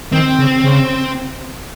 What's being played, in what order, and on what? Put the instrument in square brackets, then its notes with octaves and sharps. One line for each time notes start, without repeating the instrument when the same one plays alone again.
[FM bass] D#3 [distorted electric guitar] C4
[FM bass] C#3
C#3